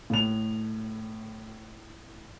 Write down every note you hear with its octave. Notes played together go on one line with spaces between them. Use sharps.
A2 F7